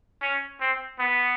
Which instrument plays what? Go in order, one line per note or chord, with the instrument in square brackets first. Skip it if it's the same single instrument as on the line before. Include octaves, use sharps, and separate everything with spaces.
[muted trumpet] C#4
C4
B3